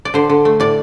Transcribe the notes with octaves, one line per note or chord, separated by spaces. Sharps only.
D5
D3 C5
D3
A3
A2 D5